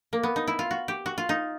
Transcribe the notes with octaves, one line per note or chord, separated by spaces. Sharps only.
A#3
B3
D#4
E4
F4
F#4
G4
F#4
F4
D#4